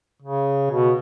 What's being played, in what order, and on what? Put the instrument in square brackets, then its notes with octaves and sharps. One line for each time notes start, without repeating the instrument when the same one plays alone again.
[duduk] C#3
B2